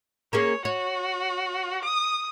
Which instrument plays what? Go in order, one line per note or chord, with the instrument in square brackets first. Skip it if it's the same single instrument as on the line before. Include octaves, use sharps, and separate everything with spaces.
[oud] A#3 C#4 G#4 [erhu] C#5
[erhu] F#4 [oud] C#5
[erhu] D#6